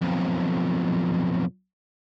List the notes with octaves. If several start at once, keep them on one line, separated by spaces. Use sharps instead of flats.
B1 F2